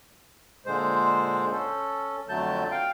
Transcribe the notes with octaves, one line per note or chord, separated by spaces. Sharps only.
A#2 D3 G#3 C5
C#4 A4
F2 D3 F#3 A3 A5 G6
F5 G5